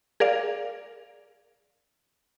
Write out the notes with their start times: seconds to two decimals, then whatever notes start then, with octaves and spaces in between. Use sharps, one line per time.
0.20 G#4 A#4 D5 F5